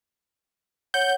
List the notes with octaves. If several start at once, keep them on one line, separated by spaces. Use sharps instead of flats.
C#5 F#5 G6